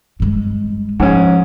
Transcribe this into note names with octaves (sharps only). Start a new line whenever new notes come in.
G2 G#3
G#2 F3 C#4